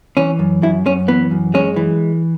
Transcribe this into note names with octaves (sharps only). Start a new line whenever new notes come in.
E3 C#4
F#2
F#2 E4
F#2 C#4
E3 B3
F#2
G#3 C#4
E3